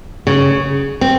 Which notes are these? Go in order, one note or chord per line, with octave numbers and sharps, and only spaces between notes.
C#3
C4